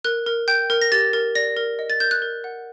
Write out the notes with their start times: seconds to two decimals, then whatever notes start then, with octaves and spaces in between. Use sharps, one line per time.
0.05 A#4 F#6
0.27 A#4
0.48 G5 G6
0.70 A#4
0.82 A#6
0.92 G4 A6
1.13 A#4
1.35 D5 A#6
1.57 A#4
1.79 D#5
1.90 A6
2.00 A#4 G6
2.11 F#6
2.22 A#4
2.44 F#5